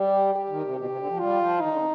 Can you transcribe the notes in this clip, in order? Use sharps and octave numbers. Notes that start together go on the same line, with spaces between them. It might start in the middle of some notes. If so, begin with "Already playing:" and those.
Already playing: G3 G4
G4
D#3
C3
B2 G4
C3
D3
F3
G3 F4
F3
D#3 D#4
D3
C3